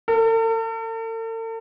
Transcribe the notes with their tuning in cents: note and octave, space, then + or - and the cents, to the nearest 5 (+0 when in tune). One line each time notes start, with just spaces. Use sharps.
A4 +45